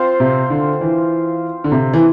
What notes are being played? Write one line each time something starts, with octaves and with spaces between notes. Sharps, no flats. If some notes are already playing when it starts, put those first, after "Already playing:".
Already playing: C4 F4 C5
C3
D3
E3
D3
C3
E3